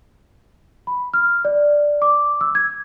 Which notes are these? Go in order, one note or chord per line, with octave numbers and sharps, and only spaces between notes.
B5
F6
D5
D6
E6
G#6